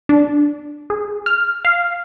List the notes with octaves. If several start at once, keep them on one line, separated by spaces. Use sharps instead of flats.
D4
G#4
F6
F5